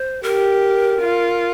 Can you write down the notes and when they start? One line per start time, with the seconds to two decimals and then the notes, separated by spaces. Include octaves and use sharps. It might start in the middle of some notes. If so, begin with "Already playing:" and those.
Already playing: C5
0.23 G4 A#4
1.00 F4